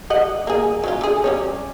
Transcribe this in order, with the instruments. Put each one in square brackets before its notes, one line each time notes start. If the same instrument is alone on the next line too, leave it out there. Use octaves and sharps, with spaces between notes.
[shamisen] G3 D#5 F#5
A#3 G#4
F#3 C#4 F4
D3 G#4
G3 C#4 C#5